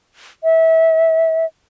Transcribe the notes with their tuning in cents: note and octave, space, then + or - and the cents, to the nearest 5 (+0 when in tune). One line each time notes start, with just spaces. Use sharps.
E5 -25